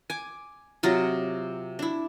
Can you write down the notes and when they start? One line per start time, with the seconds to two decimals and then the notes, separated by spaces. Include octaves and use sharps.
0.10 G#5 D6
0.83 C3 F#3 F4 D#5
1.79 D4 E4